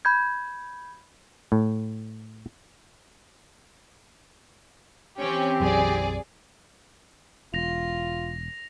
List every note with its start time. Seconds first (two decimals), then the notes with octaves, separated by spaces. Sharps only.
0.05 B5 G6 G#6
1.52 A2
5.19 E3 C4 C#4 G4 G5
5.61 B1 F#2 F#3 G#4 D5
7.54 E1 F4 A#6 F7